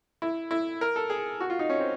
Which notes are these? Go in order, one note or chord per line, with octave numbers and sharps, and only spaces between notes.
E4
E4
A#4
A4
G#4
F#4
F4
D#4
C#4
C4